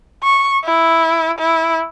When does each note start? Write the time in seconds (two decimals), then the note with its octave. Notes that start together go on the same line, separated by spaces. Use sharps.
0.24 C#6
0.64 E4
1.38 E4